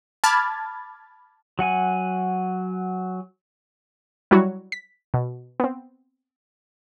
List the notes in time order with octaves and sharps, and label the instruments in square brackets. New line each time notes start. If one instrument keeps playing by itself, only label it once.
[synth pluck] A5 B5 D6 F6 G#6 A6
[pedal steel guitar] F#3 F#5 G#5
[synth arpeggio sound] F#3 G3 E4 F#4 C#5
B6
B2
B3 C4